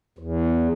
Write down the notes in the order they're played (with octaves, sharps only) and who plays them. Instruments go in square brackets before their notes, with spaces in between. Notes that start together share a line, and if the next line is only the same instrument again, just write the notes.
[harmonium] E2